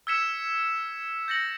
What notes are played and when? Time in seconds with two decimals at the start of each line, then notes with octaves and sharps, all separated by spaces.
0.07 E6 F6 G#6 B6 C#7 E7
1.28 G6 A6 A#6 C#7 F#7